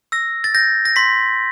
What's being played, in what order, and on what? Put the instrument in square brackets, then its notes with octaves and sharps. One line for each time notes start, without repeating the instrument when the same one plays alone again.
[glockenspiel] E6 A#6
A6
G6 A#6
A#6
C6 B6